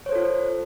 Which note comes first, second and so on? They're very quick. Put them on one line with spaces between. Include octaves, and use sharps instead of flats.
C#5 C5 A4 F4